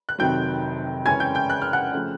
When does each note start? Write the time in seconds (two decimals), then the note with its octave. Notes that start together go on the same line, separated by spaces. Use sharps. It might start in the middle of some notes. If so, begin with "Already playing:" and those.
0.09 F#6
0.19 F1 F2 C3 D#3 F#3 G5 G6
1.06 F#2 C#3 E3 G#3 C#4 G#5 G#6
1.20 G5 G6
1.35 G5 G6
1.50 F#6
1.62 F6
1.73 F#5 F#6
1.93 C#3 F3 A3